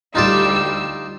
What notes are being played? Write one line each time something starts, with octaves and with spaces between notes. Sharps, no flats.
D2 G3 D#4 F4 D5 E6